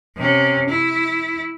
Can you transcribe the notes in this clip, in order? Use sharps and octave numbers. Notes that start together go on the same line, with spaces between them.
C3 C#4
E4